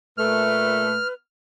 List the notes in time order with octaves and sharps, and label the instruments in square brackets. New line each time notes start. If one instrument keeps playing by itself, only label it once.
[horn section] A#2 A3 [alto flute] B4 [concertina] F6